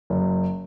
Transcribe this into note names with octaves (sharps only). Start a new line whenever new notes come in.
F#1